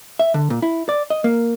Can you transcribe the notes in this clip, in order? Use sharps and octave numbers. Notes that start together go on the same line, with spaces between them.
E5
D3
A#2
E4
D5
D#5
A#3